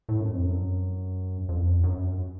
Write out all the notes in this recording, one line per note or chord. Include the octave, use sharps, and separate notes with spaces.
A2
F#2
F2
F#2
F2
F#2